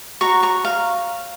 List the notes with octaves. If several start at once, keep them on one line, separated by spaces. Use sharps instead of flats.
F#4 C#5 A#5 C#6
A#5 C#6
F5